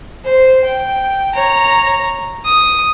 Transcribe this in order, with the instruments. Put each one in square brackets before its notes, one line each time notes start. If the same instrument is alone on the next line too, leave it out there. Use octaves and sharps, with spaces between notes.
[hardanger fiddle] C5
G5
C#5 A#5
D#6